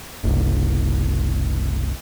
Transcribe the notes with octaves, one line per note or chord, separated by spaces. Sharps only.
F#1 C2